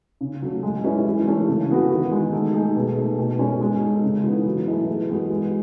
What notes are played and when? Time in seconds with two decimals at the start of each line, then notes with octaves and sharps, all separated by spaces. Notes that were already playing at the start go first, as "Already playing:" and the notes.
0.21 C#3
0.42 F#3 A3
0.63 G#3
0.84 C#4 E4 B4
1.06 E3
1.27 A3 C#4
1.48 C#3
1.69 E3 B3 F#4
1.91 D#3
2.11 G#3 D#4
2.33 A3
2.54 D#4 G#4
2.75 B2
2.96 A3 D#4
3.18 B2
3.39 G#3 C#4
3.61 G#3
3.81 D#4 A4
4.03 C#3
4.24 E3 B3
4.46 F#3
4.67 A3 E4 G#4 B4
4.87 E3
5.10 G#3 B3 F#4
5.30 G#3